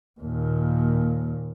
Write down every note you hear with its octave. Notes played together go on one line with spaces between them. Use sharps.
D#2 A#2